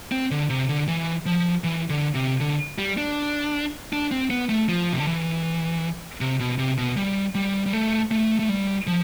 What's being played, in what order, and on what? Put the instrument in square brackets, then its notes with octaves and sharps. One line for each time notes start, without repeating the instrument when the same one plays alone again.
[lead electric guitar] C4
D3
C3
D3
E3
F3
E3
D3
C3
D3
G3
D4
D4
C4
B3
A3
F3
C3
D3
E3
C3
B2
C3
B2
G3
G3
G3
A3
A3
A3
G3
F3